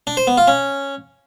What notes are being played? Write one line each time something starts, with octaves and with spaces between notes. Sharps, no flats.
D4
C5
B3
F4
C#4